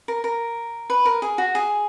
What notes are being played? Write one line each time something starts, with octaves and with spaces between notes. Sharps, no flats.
A#4
A#4
B4
A#4
G#4
F#4
G#4